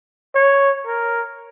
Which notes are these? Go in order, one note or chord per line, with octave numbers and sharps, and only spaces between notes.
C#5
A#4